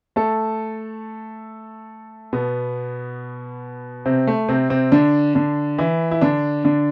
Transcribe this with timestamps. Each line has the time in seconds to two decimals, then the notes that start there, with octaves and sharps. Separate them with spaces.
0.16 A3 A4
2.33 B2 B3
4.06 C3 C4
4.27 A3
4.49 C3 C4
4.70 C3 C4
4.92 D3 D4
5.35 D3 D4
5.78 E3 E4
6.11 E4
6.21 D3 D4
6.65 D3 D4